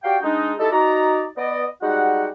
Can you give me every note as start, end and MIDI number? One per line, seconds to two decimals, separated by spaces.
0.04 0.17 66
0.04 0.17 67
0.04 0.17 74
0.04 0.17 77
0.04 0.17 79
0.23 0.53 56
0.23 0.53 62
0.23 0.53 63
0.59 0.68 57
0.59 0.68 63
0.59 0.68 64
0.59 0.68 67
0.59 0.68 69
0.72 1.24 63
0.72 1.24 66
0.72 1.24 74
0.72 1.24 82
1.38 1.65 59
1.38 1.65 74
1.38 1.65 75
1.82 2.28 55
1.82 2.28 56
1.82 2.28 63
1.82 2.28 66
1.82 2.28 78